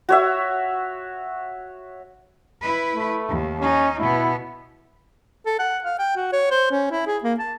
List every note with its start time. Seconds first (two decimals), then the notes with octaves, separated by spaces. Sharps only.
0.09 F#4 C#5 E5
2.61 E4 B4
2.95 A3
3.29 D#2
3.62 C#4 D#4
3.99 B2 B3 E4
5.46 A4
5.59 F#5
5.84 F5
5.99 G5
6.16 F#4
6.33 C#5
6.51 C5
6.71 C#4
6.91 E4
7.07 G#4
7.23 A#3
7.39 A5